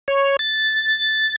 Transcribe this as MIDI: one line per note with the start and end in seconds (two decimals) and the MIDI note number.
0.08 0.37 73
0.39 1.36 93